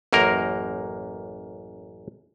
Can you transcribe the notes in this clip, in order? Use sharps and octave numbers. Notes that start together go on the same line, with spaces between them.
A1 F#2 A#3 A#4